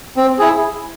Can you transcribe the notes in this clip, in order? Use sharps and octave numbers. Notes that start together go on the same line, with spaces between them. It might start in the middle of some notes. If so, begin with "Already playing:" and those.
C4
E4 G#4